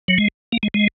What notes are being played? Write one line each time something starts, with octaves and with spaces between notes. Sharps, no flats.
F#3
G#3
A#3
G#3
G#3